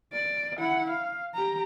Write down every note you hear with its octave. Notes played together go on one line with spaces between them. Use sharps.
D5
E4 F#5
F5
G4 A#5